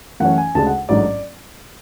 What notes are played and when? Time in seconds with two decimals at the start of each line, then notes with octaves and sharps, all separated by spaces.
0.20 F#2 E3 A3 C#4 F#5
0.38 G#5
0.55 D2 C#3 G#3 D4 A5
0.66 F#5
0.89 A1 G#2 F#3 A3 D4 D5